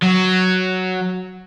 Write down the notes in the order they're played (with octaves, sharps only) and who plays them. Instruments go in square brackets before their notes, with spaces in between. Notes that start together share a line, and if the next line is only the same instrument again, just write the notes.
[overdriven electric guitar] F#3